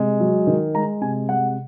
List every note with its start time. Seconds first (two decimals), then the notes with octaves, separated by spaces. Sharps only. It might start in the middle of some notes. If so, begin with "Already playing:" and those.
Already playing: C3 G#3
0.20 F#3
0.47 D#3
0.74 G#3 A#5
1.01 C3 G#5
1.29 G#3 F#5